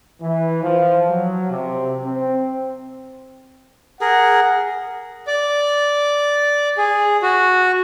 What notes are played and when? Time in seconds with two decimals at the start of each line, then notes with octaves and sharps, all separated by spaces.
0.21 E3
0.63 F3
1.10 F#3
1.50 C3
2.05 C4
4.01 G#4 A#4 F#5
5.27 D5
6.78 G#4
7.22 F#4